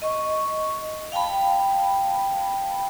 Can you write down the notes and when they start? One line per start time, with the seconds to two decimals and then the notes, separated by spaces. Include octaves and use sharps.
0.02 D#5 C#6
1.12 F5 G5 A5 B5